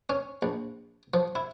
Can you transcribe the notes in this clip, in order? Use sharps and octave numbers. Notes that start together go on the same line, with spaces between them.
C#4
A#1
F3
E4